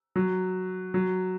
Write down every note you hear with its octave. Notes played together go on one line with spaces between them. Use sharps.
F#3
F#3